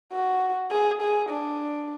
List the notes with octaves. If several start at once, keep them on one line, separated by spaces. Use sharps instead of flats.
F#4
G#4
G#4
D4